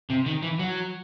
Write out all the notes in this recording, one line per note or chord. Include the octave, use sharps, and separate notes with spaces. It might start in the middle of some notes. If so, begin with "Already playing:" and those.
C3
D#3
E3
F#3